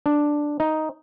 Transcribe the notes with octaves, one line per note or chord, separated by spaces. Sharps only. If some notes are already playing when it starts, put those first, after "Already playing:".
D4
D#4